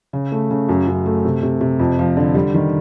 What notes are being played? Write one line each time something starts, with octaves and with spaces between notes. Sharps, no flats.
C#3
A3
C#3
F#2
F#2
A3
C3
C3
C3
F2
F3
D3
G3
D#3